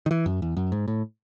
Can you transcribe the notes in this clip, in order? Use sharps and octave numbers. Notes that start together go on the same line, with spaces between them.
D#3
E3
F#2
E2
F#2
G#2
A2